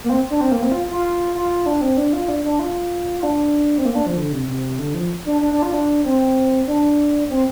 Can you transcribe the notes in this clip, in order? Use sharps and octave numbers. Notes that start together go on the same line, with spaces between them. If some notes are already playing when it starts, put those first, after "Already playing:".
A#3
C4
D4
C4
A#3
C4
F4
F4
F4
D4
C4
D4
F4
D4
D4
F4
F4
D4
C4
A#3
D4
F3
D3
C3
C3
D3
F3
D4
D4
D4
F4
D4
C4
D4
C4